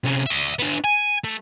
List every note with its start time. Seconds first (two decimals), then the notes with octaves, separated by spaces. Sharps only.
0.04 C3 C#4
0.26 D5 E5
0.59 B3 D4
0.84 G#5
1.24 A3